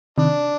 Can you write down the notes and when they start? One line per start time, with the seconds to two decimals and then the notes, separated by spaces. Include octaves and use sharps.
0.18 C3 D#3 D4